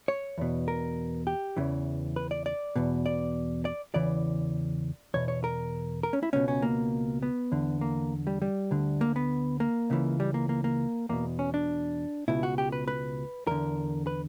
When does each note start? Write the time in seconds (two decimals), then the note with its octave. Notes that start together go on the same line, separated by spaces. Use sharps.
0.08 C#5
0.38 E2 B2
0.68 A#4
1.27 G4
1.57 E2 C#3 E3
2.16 B4
2.31 D5
2.46 D5
2.76 E2 B2
3.06 D5
3.65 D5
3.94 E2 C#3 E3 D5
5.14 E2 B2 C#5
5.28 C#5
5.44 A#4
6.03 A#4
6.13 C#4
6.23 E4
6.33 C#2 B2 C#4
6.48 C#4
6.62 A#3
7.22 B3
7.52 E2 D3
7.81 A#3
8.27 G3
8.42 G3
8.71 D2 D3
9.01 A#3
9.16 B3
9.60 A#3
9.90 C#2 C#3 E3
10.20 G3
10.34 A#3
10.49 A#3
10.64 A#3
11.09 E2 B2 A#3
11.39 C#4
11.54 D4
12.28 C#2 B2 E4
12.43 F#4
12.58 G4
12.72 B4
12.88 B4
13.47 E2 D3 A#4
14.07 B4